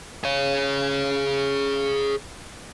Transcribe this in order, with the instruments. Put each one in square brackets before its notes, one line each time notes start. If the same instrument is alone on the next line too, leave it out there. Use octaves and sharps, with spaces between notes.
[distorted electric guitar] G#4 C#5